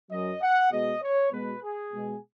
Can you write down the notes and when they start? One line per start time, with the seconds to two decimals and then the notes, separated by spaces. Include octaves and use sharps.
0.11 F#2 F#3 D#5
0.42 F#5
0.72 B2 G#3 D#5
1.02 C#5
1.32 B2 G#3 B4
1.63 G#4
1.93 B2 G#3